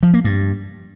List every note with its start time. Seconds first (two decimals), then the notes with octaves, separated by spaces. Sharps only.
0.03 F3
0.14 A#3
0.24 G2